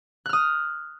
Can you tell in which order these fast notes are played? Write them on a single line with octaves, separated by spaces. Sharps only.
F#6 F6 D#6